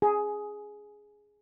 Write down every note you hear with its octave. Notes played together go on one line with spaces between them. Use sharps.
G#4